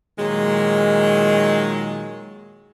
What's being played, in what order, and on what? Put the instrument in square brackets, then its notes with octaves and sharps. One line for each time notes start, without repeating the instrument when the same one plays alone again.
[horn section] A#2 D#3 F#3 G#3